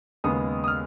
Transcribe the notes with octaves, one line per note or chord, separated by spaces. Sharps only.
D#2 C#3 G#3 B3 D#6
D#6
F6